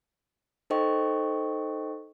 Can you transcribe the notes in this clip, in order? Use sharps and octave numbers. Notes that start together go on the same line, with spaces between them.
D#4 A4 C5 D#5 G5 C#6